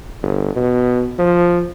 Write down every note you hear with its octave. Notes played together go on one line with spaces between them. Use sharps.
G1
B2
F3